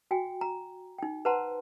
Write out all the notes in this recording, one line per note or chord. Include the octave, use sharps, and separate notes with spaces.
F#4 G5 G#5
A#5
D#4 G5
B4 C5 F#5 A5 A#5 C6